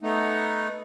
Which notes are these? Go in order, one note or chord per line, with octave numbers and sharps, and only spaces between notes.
A3 B3 D#4